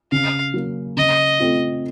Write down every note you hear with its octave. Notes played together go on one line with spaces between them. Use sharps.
C#3 F5
F#3 A#3
C#3 D#5
A3 C4 F4